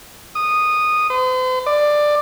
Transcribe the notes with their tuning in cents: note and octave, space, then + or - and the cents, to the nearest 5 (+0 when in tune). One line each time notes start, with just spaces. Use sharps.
D#6 -10
C5 -45
D5 +15